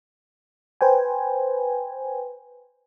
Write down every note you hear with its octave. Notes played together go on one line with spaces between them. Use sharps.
B4 C5 G5 G#5